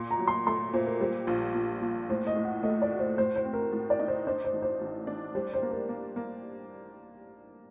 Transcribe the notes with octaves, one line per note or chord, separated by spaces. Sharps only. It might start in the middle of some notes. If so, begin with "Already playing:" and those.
Already playing: A#2 C6
A#5
F#3
C6
A3 C6
A#2 C5
A#4
G3 C5
A#1
A#2
A#2
A2 C5
D#5
A2
F#5
A3 D#5
D5
F#4
C5
A2 C5
C5
C4
A#4
A2
D5
D#4
C5
D4 C5
C5
A1
C5
A1
D4
G3 C5
C5
A#3
A#4
A#3
A#3